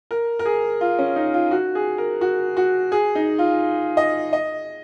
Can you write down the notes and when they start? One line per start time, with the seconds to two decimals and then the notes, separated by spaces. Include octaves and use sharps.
0.11 A#4
0.39 A#4
0.45 G#4
0.81 F4
0.99 C#4
1.16 D#4
1.34 F4
1.51 F#4
1.75 G#4
1.98 A#4
2.21 F#4
2.57 F#4
2.92 G#4
3.15 D#4
3.39 F4
3.97 D#5
4.33 D#5